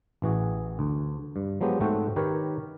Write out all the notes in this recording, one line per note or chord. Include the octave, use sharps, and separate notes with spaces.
A1 E3 F#4 G#4
D2
G2
F3 F#3 G#3 B3 G4
G#2 A3 C4 F#4 G5
D#3 G4 A#4 B4 C#5